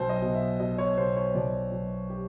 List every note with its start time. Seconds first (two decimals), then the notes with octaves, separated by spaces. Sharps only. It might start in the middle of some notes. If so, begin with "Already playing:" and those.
Already playing: B1 C5
0.09 D#5
0.22 B2
0.35 E5
0.60 B2 D#5
0.78 C#5
0.97 B2 C5
1.16 C#5
1.35 B1 D5
1.72 B1
2.10 G4